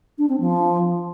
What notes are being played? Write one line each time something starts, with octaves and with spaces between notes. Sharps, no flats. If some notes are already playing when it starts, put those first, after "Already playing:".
D4
C4
F3